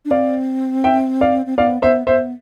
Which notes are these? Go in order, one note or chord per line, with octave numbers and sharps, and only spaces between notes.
D4
C4 D5 F5
E5 G5
D5 F5
C4
B3 D5 F5
B3 C5 E5
B3 C5 E5